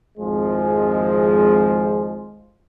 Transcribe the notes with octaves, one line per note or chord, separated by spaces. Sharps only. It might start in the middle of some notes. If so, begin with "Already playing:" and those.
G#1 F2 F3 G#3